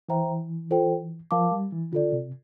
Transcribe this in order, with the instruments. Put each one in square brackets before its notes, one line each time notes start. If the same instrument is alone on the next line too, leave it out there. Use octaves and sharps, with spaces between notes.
[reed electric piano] E3 [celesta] C5 E5 G5 A#5
[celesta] F4 A4 C5 G5
[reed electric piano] F3 [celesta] A#4 F5 A5 D6
[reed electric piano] G3
E3
[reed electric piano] D3 [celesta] F4 A4 D5
[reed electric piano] C3